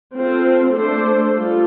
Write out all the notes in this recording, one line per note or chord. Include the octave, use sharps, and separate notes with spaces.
C4 F4 A4 C5
A3 D4 A4 C5
G3 F4 A4